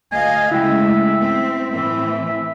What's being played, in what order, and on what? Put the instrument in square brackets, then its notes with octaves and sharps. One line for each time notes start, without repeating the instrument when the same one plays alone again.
[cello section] D2 D#5 F5 [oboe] G#5
[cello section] C#3 G#3 A3 [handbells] E4 G5 [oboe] E5
[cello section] C4
[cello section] A2 E3 C4 [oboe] E5